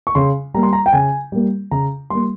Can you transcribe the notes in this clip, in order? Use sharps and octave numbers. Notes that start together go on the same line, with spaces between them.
C#6
C#3 C6
G3 A#3 A#5
C6
A#5
G5
C#3 G#5
G3 A#3
C#3 A#5
G3 A#3 C6